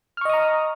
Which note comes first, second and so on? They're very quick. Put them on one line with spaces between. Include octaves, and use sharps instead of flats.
F6 C#6 D#5 D#6 A#5